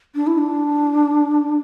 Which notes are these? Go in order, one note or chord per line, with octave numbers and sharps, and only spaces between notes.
D4
E4
D4